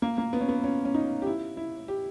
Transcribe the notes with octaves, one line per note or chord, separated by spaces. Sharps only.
A#3
A#3
B3
C#4
B3
C#4
C#4
D#4
G4
E4
E4
G4